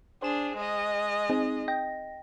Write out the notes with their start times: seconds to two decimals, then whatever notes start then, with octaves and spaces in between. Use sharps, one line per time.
0.22 D4 G#4 C5 E7
0.56 G#3 D#5
1.30 C4 D#4 G#4
1.68 D#5 G5 A#6